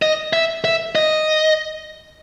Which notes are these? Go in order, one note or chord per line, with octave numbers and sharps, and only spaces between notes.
D#5
E5
E5
D#5